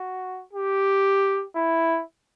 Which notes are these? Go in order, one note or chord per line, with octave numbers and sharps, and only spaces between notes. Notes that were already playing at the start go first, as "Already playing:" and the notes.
Already playing: F#4
G4
E4